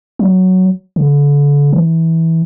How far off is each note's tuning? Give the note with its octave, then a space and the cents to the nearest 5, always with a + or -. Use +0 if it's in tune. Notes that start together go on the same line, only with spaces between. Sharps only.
F#3 +5
D3 -35
E3 -15